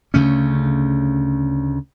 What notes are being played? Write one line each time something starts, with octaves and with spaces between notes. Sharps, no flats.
D2 C#3 A3 C#4